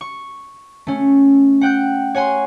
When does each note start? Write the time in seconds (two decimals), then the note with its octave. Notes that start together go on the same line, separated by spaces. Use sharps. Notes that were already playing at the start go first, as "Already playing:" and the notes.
0.01 C#6
0.87 A3 C#4
1.61 F#5 G5 F#6 G6
2.15 C#5 F#5 G#5 C6